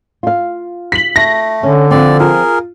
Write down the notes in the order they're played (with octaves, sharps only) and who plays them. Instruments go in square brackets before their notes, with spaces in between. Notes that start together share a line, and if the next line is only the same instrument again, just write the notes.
[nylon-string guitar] F4 F5
[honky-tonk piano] B6 F#7
[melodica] A3 [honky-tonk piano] A#6
[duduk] D3 [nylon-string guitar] C#4
[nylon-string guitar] F3 C4 [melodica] D5
[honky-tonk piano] F4 [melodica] G#4 A#4